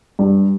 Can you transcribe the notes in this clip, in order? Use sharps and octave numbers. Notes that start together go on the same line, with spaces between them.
G2